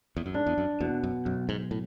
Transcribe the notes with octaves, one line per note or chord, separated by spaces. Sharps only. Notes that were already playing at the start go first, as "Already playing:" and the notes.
E2
F#2
G#2 D4
E2
F#2
E2 B2
F#2
B1 F#2
G#2
A2